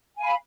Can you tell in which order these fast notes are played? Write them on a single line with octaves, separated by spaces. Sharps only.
G#5 F5 B5